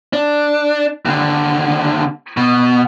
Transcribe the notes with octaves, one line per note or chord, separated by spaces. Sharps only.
D4
D#2 D3
B2